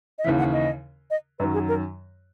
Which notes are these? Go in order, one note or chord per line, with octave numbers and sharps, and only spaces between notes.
D#5
D#2 C#3 E3 E5
F#5
D#5
D#5
F#2 D#3 F#3 B4
G#4
A#4